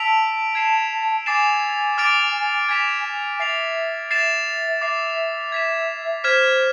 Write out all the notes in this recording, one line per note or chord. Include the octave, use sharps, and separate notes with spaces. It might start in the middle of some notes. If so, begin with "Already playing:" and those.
Already playing: A5 E6 B6 D7 F7
G#6 C7 E7
G#5 D6 A6 C7 E7
D6 F6 A6 D7 F7
G#5 G#6 B6 E7
G#5
E5 A6 C7 F7
A6 C7 E7
E5 D6 A6 C7
G#6 B6 E7
C5 F6 G#6 B6 E7